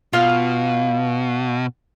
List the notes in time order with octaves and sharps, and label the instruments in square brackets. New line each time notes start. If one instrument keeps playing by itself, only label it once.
[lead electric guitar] B2 [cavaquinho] F4 F5